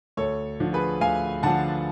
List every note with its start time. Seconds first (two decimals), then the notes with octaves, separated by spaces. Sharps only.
0.17 D2 A4 C#5
0.60 D3 F3
0.73 G#4 B4
1.01 D2 F5 G#5
1.43 D3 F3 F#5 A5